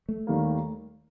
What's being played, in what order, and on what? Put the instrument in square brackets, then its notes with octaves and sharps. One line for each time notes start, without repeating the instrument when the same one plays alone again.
[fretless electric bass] A3
[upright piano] D#2 D#3 G3 A#3